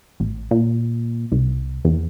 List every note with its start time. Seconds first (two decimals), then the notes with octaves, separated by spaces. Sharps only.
0.20 A1
0.51 A#2
1.32 C2
1.85 E2